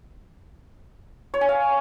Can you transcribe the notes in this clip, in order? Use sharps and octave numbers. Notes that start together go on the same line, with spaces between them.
C#5
G#5
F5